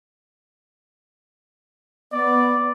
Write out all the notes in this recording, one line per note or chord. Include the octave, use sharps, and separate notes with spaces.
B3 D5